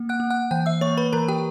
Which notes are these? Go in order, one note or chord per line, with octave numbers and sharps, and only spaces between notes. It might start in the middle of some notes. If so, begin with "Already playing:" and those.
Already playing: A#3
F#5 F#6
A#3
F#5 F#6
E3 G5 G6
E5 E6
A#3 C#5 C#6
B4 B5
E3 A#4 A#5
G4 G5